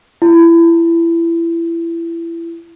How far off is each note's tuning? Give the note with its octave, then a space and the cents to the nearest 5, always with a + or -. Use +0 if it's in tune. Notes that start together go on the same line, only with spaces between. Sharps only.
E4 +25